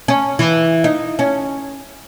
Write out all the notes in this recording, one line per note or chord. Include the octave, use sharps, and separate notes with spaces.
C#4
E3
D#4
C#4